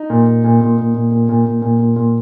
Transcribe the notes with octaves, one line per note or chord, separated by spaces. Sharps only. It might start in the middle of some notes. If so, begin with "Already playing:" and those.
Already playing: D#4
A#2
A#2
A#2
A#2
A#2
A#2
A#2
A#2
A#2
A#2
A#2
A#2